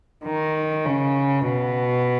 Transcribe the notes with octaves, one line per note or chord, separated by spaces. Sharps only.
D#3
C#3
B2